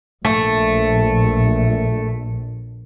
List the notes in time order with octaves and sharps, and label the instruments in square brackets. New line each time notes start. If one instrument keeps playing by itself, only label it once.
[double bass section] A#1 [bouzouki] A3